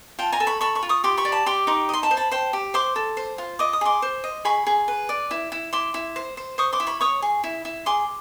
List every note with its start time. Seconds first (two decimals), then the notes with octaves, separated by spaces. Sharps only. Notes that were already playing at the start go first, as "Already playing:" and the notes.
0.19 F4 G5 A5
0.32 G#5 A#5
0.40 A4
0.47 B5 C#6
0.61 A4 B5 C#6
0.75 B5 C#6
0.83 F4
0.89 C#6 D#6
1.04 G4 C6 D6
1.17 B5 C#6
1.25 D5
1.32 A5 B5
1.46 G4 C6 D6
1.67 D#4 C6 D6
1.89 D#5 C6
2.03 A5 B5
2.11 C5
2.17 A5 B5
2.31 C5 G5 A5
2.53 G4
2.74 C5 C6 D6
2.96 A4
3.17 C5
3.38 F4
3.59 D#5 D6
3.73 D#6
3.81 G#4 C6 D6
4.02 C5
4.24 D#5
4.45 G#4 B5 C#6
4.67 G#4
4.88 B4
5.09 D5
5.31 E4
5.52 E4
5.73 E4 C6 D6
5.94 E4
6.16 C5
6.37 C5
6.58 C5 C#6 D#6
6.72 C6 D6
6.80 E4
6.87 B5 C#6
7.01 C#5 C#6 D#6
7.22 G#4
7.44 E4
7.65 E4
7.86 G#4 C6 D6